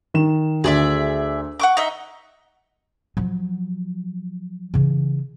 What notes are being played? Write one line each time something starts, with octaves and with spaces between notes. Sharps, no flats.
D#3 E7
D2 G#4 D5 E5
F#5 C#6 D6
D#4 D#5 E5
F3 F#3
C#3 E3